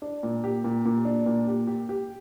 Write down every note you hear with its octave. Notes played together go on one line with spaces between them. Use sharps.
D4
A#2
G4
A#2
A#2
D4
A#2
G4
G4
G4